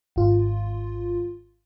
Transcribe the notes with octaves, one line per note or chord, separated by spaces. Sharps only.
G#1 F4